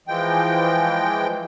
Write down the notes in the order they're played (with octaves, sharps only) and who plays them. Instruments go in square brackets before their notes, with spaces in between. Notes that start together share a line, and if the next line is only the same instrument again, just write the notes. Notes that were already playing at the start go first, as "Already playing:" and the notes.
[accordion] E3 F3 G#3 G5